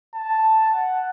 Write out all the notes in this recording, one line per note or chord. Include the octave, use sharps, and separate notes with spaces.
A5
F#5